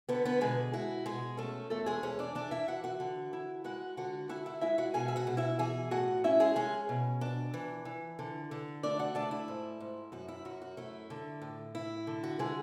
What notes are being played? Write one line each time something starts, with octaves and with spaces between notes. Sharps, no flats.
D3 B3 B4
B3 B4
B2 G#3 G#4
E4 F#4
B2 G#3 G#4
A3 C#4 A4
E2 A3 A4
G#3 G#4
E2 C#4 C#5
D4 D5
E3 D4 D5
E4 E5
E3 F#4 F#5
F#4 F#5
D3
E4
G#3 F#4 F#5
D3 F#4 F#5
E4 F#4 F#5
E4 E5
G#3 E4 E5
F#4 F#5
B2 G#4 G#5
E5
F#4 F#5
B2
E4 E5
E3 G#4 G#5
A2 F#4 F#5
C#4 E4 E5
G#3 G#4
G#3 C#4 G#4
B2
D4
E3
E3
D3
D3
A3 D4 D5
F#4 F#5
A3 D4 D5
E4
G#2
G#2
F#2 F#4
E4
F#2 F#4
F#4
A3 E4
D3
A2
E4
D3
F#4
D3 G#3 G#4